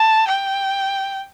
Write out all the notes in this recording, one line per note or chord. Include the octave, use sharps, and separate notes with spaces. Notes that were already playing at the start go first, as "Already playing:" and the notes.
Already playing: A5
G5